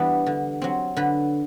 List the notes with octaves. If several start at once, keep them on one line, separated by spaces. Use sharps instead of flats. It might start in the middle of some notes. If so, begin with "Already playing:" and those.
Already playing: E3 G3 B3 D4
D3
F#3 C4
D3 B4